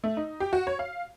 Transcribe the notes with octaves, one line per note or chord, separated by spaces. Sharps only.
A3
D#4
G4
F#4
C#5
F5